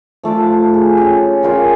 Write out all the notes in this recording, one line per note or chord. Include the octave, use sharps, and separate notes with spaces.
F3 A3 F4 D6
G#4
C#4 G4
C#3 C#4 F4 A#4